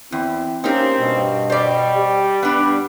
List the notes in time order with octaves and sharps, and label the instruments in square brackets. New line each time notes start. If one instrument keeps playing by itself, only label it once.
[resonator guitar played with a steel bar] E2 [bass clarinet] C4 [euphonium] E4
[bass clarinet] A#3 [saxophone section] C4 [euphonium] C#4 [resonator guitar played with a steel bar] D#4 G4 A#4
[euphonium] G2 [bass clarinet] B2
[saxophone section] G3 [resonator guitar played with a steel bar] C5 D5
[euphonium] G4
[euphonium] G2 [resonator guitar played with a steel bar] B3 D4